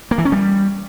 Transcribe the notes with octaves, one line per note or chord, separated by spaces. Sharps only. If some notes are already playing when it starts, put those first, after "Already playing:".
A#3
E3
C#4
G3